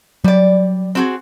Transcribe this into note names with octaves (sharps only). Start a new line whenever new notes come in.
F#3 G3 D5
C4 F#4 G#4